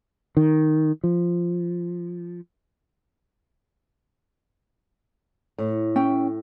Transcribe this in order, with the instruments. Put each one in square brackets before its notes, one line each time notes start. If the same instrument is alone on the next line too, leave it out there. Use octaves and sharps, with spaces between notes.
[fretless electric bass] D#3
F3
[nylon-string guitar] A2
[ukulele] C#4 E4 G5